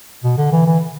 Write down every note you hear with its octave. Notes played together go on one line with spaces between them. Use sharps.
B2
D3
E3
E3